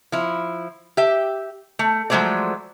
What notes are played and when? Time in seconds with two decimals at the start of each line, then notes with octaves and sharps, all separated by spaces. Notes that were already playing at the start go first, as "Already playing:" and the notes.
0.12 F3 E4
0.97 G4 E5
1.79 A3
2.10 F3 F#3 G#3 A3 C5 D5